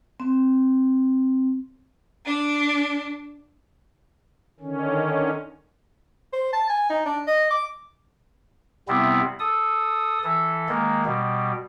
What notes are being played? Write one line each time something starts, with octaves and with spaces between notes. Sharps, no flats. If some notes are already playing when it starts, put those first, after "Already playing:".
C4
D4
D3 D#3 C#4
C5
A5
G#5
D#4
D4
D#5
D6
C3 G3 B3 C4 E4
A4 D#6
E3 A4
D#3 G#3 A#3
B2 G3